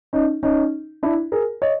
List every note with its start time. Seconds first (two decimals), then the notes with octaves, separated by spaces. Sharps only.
0.13 C#4 D#4
0.43 C#4 D#4
1.03 D4 E4
1.32 G#4 A#4
1.62 C#5 D#5